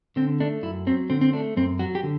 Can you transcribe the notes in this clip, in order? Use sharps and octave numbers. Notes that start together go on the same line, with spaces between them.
D3 C4
A3 D4
F#2 E4
F#3 C4
D3 C4
C4
A3 D4
F#2 C4
F#3 F#4
G4
D3